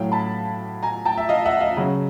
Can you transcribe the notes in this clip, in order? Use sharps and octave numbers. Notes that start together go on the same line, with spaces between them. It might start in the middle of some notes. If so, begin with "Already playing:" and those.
Already playing: A2 F#3 F5 G5
A5 B5
G#5 A#5
G5 A5
E5
D#5 F5
E5 F#5
D#5 F5
C#3 F#3